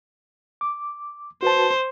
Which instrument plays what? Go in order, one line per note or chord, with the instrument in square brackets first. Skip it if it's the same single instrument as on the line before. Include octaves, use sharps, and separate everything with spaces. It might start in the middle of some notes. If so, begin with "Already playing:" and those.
[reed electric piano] D6
[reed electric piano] F#4 B4 A5 [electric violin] C5